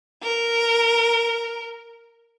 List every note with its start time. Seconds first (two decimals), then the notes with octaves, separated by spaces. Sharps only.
0.22 A#4